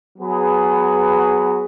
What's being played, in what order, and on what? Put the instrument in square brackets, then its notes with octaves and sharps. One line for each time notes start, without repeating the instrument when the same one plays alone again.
[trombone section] F#3 B3 G#4 B4